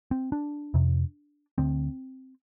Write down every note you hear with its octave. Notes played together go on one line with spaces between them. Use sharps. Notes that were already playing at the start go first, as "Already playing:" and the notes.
C4
D4
F2 C3
D2 D3 C4